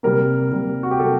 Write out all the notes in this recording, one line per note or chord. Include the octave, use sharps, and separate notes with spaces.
C3 G3 A#3 A#4
C3 G3 A#3
F#4
G4
C3 G3 A#3 A4